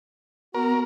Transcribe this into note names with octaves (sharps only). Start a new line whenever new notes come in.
B3 F#4 A#4